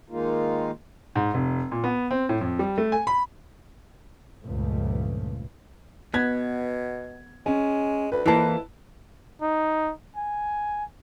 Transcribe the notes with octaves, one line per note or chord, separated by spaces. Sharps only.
D#3 G#3 A#3 D#4 F4
G#2
F1
A#2
B3
C4
A2
F2
G3
A3
G#5
B5
C#2 G2 A#2 F3 A3
B2 B3 G#6
G#3 C#4
D2 B4
F2 E3 A#3 E4 B4 A5
D#4
G#5